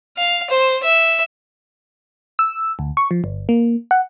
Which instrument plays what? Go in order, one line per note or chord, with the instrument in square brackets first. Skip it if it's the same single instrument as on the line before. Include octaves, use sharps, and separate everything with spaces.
[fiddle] F5
C5
E5
[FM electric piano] E6
D2
C#6
F3
G1
A#3
F#5